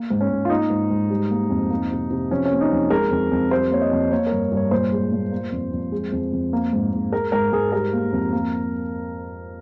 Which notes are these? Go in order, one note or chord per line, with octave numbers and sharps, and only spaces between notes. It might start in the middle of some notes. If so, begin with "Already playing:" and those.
Already playing: A#3
G#2
C#4
G#2
F4
A#3 D#4
G#2
G#2
G3
A#3
F2
A#3
C3
C3
F3 C#4
C#4
A#3
D#4
F2
G#3 A#4
F2
F2
G3 C5
A#3 C#5
D#5
F2
A#3 C#5
G2 A#4
G2
C#5
A#2 C5
G#3
A#2
A#3
F2
F2
G#3
F2
F2
A#3
G#2
G#2
G#3 A#4
G#2 A#4
G#2 G#4
G3 A#4
A#3
F2
A#3